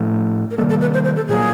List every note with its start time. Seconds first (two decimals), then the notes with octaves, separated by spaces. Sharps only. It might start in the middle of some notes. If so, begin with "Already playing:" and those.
Already playing: A2 F3 A3
0.51 A#4
0.57 C3 D#3 G3 A#3 A4
0.69 A4
0.81 B4
0.94 C5
1.05 C5
1.16 A4
1.28 A#2 F#3 A#3 G#4